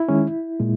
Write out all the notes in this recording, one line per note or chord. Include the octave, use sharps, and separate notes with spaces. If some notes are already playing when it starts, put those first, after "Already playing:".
Already playing: E4
D#3 G#3 C#4
A#2 G#3